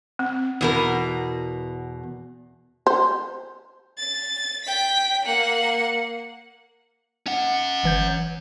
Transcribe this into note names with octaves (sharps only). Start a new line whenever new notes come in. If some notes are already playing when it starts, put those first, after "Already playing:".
C4
E2 B2 A#4
C5
A6
G5 B6
A#3 F#5
C#4 F#5
G1 E3 G6